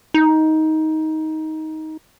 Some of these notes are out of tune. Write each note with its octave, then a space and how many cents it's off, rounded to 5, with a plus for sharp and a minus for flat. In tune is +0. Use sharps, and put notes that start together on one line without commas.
D#4 +15